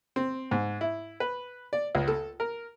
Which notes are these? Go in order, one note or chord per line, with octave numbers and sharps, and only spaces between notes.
C4
G#2
E4
B4
D5
C#2
A4
A#4